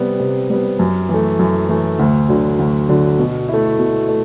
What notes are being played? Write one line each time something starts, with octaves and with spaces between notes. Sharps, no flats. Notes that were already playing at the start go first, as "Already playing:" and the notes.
Already playing: C3 G3 B3
C3
G3 B3
F#2
E3 A3
F#2
E3 A3
D2
D3 F#3
D2
D3 F#3
B2
A3 E4
B2
A3